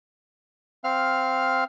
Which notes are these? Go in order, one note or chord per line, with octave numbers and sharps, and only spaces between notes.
C4 F5 F6